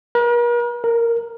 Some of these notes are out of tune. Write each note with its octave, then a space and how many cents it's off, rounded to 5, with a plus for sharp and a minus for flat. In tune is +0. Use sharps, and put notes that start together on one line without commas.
A#4 +45
A#4 -5